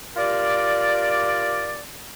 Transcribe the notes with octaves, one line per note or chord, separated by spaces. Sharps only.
F4 G4 A#4 D5